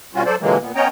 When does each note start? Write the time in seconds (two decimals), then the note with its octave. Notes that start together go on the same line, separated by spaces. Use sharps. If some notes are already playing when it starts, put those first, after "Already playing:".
0.15 B2 G3 C#4 F4 F#4
0.26 F#3 A4 C5 D5
0.41 A#2 D3 E3 F#3 G#3 A#3
0.61 A#2 B3
0.75 B3 C#4 C#5 D#5 G5 A#5